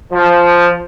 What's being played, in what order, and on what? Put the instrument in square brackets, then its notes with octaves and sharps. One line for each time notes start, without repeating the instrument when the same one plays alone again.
[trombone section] F3